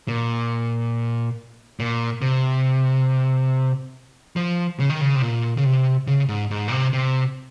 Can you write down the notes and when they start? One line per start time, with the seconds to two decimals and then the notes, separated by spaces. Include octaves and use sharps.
0.08 A#2
1.80 A#2
2.22 C3
4.36 F3
4.80 C#3
4.90 D#3
5.01 C#3
5.16 C3
5.22 A#2
5.57 C#3
5.65 C3
6.07 C#3
6.29 G#2
6.51 G#2
6.68 A#2
6.72 C3
6.93 C3